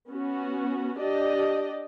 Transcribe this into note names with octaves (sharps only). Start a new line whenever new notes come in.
B3 C#4 F#4
D4 G4 D5 D#5